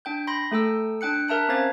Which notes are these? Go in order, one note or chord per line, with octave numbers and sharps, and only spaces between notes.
D4 G5 G6
B5 C6 A#6
A3 A4 G5 E6
D4 G5 F#6 C#7
A#4 E5 A5 F#6
C4 C#4 C5 F5 G#6 A6